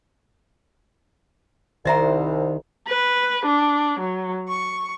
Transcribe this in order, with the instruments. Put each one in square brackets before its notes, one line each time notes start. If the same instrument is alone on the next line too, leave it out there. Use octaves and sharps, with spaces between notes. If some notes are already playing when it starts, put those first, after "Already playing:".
[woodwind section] C2 [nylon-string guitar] D#3 D#4 C5 [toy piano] D#5 E5 A#5
[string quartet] B4
D4
F#3
C#6